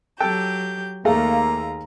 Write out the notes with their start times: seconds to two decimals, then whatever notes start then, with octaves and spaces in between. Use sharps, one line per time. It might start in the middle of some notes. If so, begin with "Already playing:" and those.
0.20 F#3 G4 A4 G5 A5 G6
1.05 D#2 A3 A#3 G#4 F5 A#5